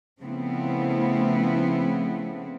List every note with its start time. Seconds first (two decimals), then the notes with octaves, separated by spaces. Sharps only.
0.20 C#3 F3 A3 B3 C4 E4